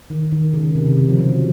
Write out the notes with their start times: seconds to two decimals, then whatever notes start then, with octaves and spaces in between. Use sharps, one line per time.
0.10 D#3
0.32 D#3
0.53 C#3
0.75 C3
0.86 C3
0.97 C#3
1.09 F3
1.19 F#3